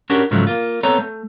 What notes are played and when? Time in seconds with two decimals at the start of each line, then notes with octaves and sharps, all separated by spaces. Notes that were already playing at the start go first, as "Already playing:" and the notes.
0.10 C#4 D4 F#4 G4 A#4
0.31 G#2 C#3 F3 F#3 A3
0.47 A#3 F4
0.83 B3 C4 A4 C#5 A#5
0.98 A3